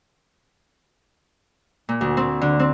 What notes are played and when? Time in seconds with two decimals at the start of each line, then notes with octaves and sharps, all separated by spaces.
1.89 A#2
2.01 D2
2.17 C4
2.41 D3
2.59 C4